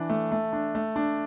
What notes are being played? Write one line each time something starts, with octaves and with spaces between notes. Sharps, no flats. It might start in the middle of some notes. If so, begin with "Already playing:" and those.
Already playing: E3 D4
A3
A3
D4
A3
D4